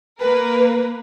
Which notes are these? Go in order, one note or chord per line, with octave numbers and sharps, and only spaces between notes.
A#3 A#4 B4